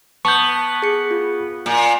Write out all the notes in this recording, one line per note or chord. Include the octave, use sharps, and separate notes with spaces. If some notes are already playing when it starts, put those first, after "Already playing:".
B3 A5 C#6 G6
G#4 C#7
F4
A#2